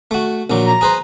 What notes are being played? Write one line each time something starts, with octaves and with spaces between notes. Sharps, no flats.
A3 F#4
A#1 A#2 F#3
A#5
G#4 B4 C5